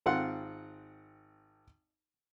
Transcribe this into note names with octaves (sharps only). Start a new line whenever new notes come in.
G#1 C4 F4 F#5 C6